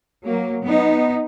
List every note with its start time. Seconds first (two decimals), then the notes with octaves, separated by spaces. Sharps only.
0.24 F#3 A#3
0.64 B3 D#4